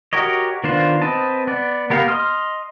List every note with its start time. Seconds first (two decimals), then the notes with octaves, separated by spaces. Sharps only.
0.13 F#4 G4 A#4 C#5 D#5
0.64 D#3 B3 D4 F4 C5
1.02 C4 B4 D#5 A5
1.47 B3 D5
1.90 A#3 B3 G4 A#4 F5
2.08 D#5 C6 D#6 F6